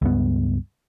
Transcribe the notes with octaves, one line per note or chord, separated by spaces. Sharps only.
C#2 G2 B3